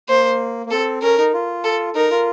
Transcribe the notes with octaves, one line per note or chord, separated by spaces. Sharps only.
A#3 C5
A#3
C4 A4
C#4 A#4
D#4
F4
A4
D#4 A#4
F4